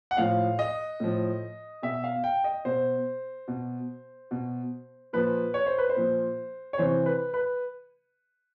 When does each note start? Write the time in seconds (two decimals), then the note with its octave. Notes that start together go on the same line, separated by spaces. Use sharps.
0.11 F#5
0.17 A2 F3 F5
0.59 D#5
1.00 A2 F3
1.82 B2 E5
2.04 F5
2.24 G5
2.44 D#5
2.65 B2 C5
3.48 B2
4.31 B2
5.13 A#2 F3 B4
5.54 C#5
5.66 C5
5.78 B4
5.89 C5
5.96 A#2 F3
6.73 C#5
6.78 C3 E3 C5
7.06 B4
7.34 B4